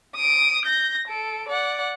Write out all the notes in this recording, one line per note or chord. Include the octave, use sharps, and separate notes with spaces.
D#6 D7
G6 A#6
A4 D7
D5 F#5